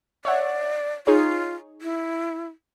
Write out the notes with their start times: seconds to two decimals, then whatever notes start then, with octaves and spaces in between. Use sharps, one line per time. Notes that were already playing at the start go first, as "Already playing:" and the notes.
0.25 C#5 D5 E5 F#5
1.07 D#4 F4 G#4 C#5
1.82 E4